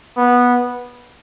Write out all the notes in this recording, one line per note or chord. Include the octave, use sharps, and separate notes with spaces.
B3